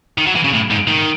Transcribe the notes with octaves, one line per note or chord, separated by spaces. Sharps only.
D#3
F#3
E3
C#3
A2
G#2
D#3